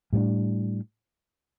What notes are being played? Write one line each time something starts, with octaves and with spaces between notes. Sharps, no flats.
A2 G3 B3 D4